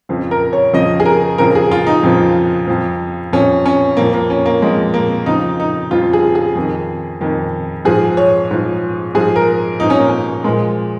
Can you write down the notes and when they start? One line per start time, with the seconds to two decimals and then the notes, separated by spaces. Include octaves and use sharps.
0.09 F2 C#3 F3
0.31 A#4
0.53 C#5
0.73 F2 C#3 F3 D#5
1.00 G#4
1.06 A#4
1.38 F2 C#3 F3 A#4
1.55 G#4
1.71 F4
1.87 D#4
2.03 F2 C#3 F3
2.67 F2 F3
3.33 F2 F3 C#4
3.66 C#4
3.97 F2 F3 A#3
4.13 A#3
4.30 C#4
4.46 A#3
4.62 F2 F3 G#3
4.94 A#3
5.26 F2 C#3 F3 D#4
5.60 D#4
5.91 F2 C#3 F3 F4
6.13 G#4
6.35 G#4
6.55 F2 D#3
7.21 F2 D#3
7.85 G#2 F3 G#4
8.17 C#5
8.51 G#2 F3
9.14 G#2 F3 G#4
9.36 A#4
9.80 G#2 F3 D#4
9.90 C#4
9.99 A#3
10.08 C#4
10.44 A#2 F3 G#3